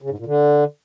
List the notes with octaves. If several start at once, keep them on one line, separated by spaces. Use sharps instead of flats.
C#3
G#2
A#2
D3